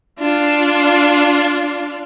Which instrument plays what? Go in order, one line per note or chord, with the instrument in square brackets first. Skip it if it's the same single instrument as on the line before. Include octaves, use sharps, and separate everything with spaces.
[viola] D4 F4